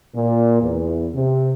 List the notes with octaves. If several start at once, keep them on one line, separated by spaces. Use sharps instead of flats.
A#2
E2
C3